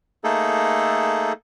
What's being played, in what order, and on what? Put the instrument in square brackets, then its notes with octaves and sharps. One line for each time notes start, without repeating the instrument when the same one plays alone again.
[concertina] A3 A#3 D#4 G#4 A4